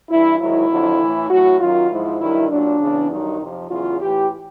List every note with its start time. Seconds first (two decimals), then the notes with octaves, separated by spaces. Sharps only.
0.10 G2 E3 E4
0.39 G#2 D#3 F#3 E4
0.69 F2 D3 F#3
0.99 A2 E3
1.29 A2 F#3 F#4
1.60 F#2 D#3 F#3 F4
1.90 G#2 F3 E4
2.20 G2 D#3 F#3 E4
2.49 A#2 F#3 D4
2.80 E2 C#3 E3
3.10 G2 D#3 F#3 D#4
3.39 F2 C3 F3
3.69 E2 C#3 F#3 F4
4.00 A2 E3 G4